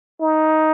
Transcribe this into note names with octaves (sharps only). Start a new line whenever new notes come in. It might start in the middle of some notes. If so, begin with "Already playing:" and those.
D#4